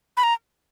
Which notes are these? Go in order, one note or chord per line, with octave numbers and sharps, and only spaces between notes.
B5
A#5